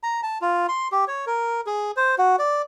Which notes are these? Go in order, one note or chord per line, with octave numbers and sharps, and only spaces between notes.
A#5
A5
F4
C6
G4
C#5
A#4
G#4
C5
F#4
D5